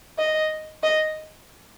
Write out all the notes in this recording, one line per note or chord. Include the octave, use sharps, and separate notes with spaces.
D#5
D#5